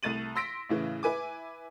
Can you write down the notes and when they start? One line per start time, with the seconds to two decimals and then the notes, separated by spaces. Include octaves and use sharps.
0.03 C2 A3 A6 D#7 F#7
0.36 C6 E6 A#6 B6 D7
0.69 A2 C#3 E3
1.03 E4 B4 G#5 D6